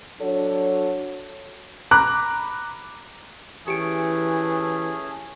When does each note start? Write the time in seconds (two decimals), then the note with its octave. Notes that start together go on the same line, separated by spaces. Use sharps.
0.21 F#3 D4 F#4 A4 C#5
1.91 A#5 B5 D6 F#6
3.68 E3 A3 C#4 G4 G#4 D7